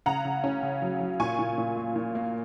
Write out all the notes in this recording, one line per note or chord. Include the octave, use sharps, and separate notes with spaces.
C#3 F#5 A#5
C#3
C#4
C#3
F#3
F#3
A#2 G#5 C#6
A#2
A#2
A#3
A#2
A#3